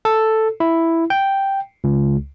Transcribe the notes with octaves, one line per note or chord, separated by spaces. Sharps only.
A4
E4
G5
C#2